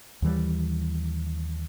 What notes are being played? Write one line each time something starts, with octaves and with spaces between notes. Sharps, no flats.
D#2 E3 G3